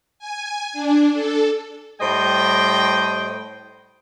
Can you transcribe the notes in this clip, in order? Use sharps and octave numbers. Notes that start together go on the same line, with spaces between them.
G#5
D4
A4
A2 G3 C5 D#5 G5